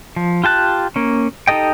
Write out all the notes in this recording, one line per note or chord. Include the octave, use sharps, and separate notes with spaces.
F3
F4 G4 A5 F#6
A#3 C#4
D#4 G4 A4 D#5 G5